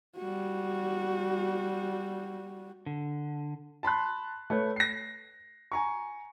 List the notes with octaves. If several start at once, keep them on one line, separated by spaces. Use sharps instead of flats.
G3 F#4
D3
A5 B5 C6 F#6
A3 B4 C#5
A#6 C7
G#5 A#5 C#6